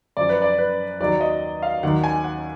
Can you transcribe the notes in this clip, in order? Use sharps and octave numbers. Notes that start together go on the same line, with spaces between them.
F#2 F3 D5
B4
D5
B4
D#2 D#3 F#3 D5
D#5
F5
D#2 D#3 F#3 F#5
G#5
F#5